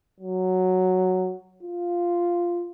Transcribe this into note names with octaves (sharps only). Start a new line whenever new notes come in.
F#3
F4